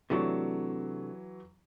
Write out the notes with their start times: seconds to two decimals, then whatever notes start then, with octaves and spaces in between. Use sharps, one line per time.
0.10 C3 E3 F#3 A3 D4 C#6